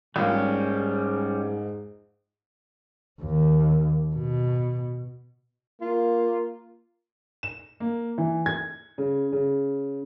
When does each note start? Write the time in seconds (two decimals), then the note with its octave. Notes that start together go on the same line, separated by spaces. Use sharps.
0.16 A#1 G#2 G3 A#3 C#4 F4
3.22 D#2
4.15 B2
5.82 A#3 F4
7.43 E7
7.80 A#3
8.18 E3
8.46 G#6
8.98 C#3
9.32 C#3